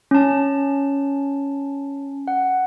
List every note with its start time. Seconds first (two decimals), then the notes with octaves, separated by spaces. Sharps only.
0.11 C#4 A5
2.28 F#5